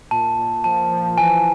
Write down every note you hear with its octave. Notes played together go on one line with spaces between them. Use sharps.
A#2 A5
A#2
F3 A5
F3
E3 G#5